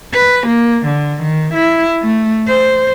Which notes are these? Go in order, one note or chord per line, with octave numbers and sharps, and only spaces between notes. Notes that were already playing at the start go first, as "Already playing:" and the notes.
B4
A#3
D3
D#3
E4
A3
C5